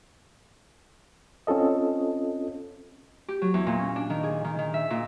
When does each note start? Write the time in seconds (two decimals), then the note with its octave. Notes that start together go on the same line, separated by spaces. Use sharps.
1.47 C4 C#4 F4 A4 D#5
3.28 G4
3.42 F#3
3.54 E2
3.67 A#2
3.79 C#4
3.96 D4
4.10 D#3
4.23 G#4
4.44 D#3
4.59 D#3
4.74 E5
4.90 A#2